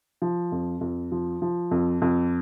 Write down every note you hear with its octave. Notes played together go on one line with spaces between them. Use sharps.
F3
F2
F2
F3
F3
F2
F2